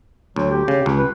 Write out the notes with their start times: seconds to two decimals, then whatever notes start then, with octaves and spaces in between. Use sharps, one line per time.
0.36 D2 F#3
0.51 G4
0.68 C#3
0.86 C#2
0.98 B4